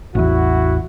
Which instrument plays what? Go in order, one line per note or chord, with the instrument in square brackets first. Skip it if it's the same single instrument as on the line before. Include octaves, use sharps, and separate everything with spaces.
[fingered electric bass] A1 E2 [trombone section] E4 F#4